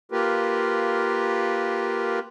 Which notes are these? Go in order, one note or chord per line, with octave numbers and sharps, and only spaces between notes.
A#3 F4 G4 A#4 B4